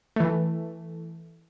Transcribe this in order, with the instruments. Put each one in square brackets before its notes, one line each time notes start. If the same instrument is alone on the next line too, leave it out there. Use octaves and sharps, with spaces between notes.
[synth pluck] E3 A3